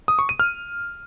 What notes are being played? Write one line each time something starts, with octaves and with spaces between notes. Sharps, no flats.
D#6
C#6
D#7
F6